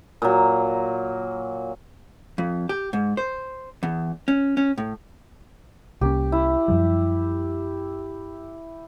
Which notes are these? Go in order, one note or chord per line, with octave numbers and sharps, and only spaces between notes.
A#2 F#3
F2
G4
G#2
C5
E2
C#4
C#4
A2
C2 A#3 C#4 G4
E4
F#2 F3 G3